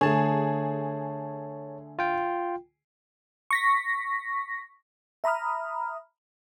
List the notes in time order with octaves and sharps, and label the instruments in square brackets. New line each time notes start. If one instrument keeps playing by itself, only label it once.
[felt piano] D3 A3 [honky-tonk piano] G#4 [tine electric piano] C#5 A5
[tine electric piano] F4 G5
[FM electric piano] C#6 A#6 B6
E5 A#5 B5 D#6 F6